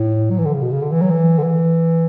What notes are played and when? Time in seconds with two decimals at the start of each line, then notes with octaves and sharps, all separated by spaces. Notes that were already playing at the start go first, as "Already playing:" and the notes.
Already playing: A2
0.30 F#3
0.39 E3
0.45 D3
0.54 C#3
0.62 B2
0.72 C#3
0.82 D3
0.92 E3
1.02 F#3
1.10 E3
1.38 D3
1.43 E3